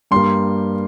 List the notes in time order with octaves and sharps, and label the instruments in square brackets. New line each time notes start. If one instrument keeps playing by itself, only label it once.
[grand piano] G2 G3 A#3 C6